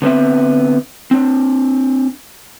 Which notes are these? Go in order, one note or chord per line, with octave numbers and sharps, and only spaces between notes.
D3 B3 C4 E5
C4 D4